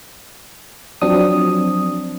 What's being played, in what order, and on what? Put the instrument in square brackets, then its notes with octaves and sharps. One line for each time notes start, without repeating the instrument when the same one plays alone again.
[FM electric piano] F3 F#3 C4 D4 D#6